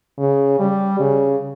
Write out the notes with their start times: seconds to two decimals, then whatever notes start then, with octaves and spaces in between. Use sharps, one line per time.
0.18 C#3
0.59 G3
1.00 C#3